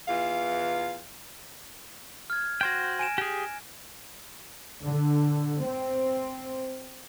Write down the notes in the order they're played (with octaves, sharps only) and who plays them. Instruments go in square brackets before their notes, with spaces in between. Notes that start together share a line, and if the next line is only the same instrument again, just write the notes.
[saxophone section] E2 E3 F4 F5
[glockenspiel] F6 G#6
[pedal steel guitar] F#4 C5 G5 [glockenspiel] F#6 G#6 A#6
[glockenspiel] G#5 D7 E7
[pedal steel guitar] G4 G#4 [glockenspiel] D7
[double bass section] D3
C4